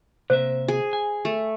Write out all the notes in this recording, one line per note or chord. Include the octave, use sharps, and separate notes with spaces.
C3 A#3 C5 E5
G#4
G#5
A3